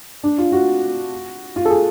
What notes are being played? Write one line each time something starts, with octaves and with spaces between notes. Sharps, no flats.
D4
F4
F#4
F4
A4
G#4